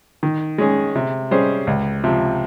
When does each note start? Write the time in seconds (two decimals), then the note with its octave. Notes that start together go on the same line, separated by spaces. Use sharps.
0.23 D#3
0.58 G#3 C#4 G#4
0.95 C3
1.31 G3 C#4 G#4 C5
1.67 C#2
2.04 C3 F3